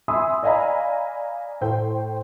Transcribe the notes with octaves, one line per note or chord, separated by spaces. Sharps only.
E5 G#5 B5 C6 D#6 E6
D5 D#5 F5 G#5 A#5 B5
A2 C5 G5